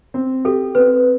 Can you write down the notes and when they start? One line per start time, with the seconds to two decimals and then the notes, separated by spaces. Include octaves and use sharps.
0.14 C4
0.45 G4 A4
0.75 C4 B4